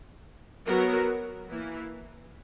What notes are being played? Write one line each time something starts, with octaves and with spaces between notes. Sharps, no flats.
F#3 B3 F#4 A#4
E3 A#3 E4